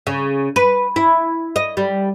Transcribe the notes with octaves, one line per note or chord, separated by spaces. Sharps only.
C#3
B4
E4
D#5
G3